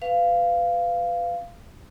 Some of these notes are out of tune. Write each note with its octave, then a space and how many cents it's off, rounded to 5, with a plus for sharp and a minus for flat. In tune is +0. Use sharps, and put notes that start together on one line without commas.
B4 +20 F5 -10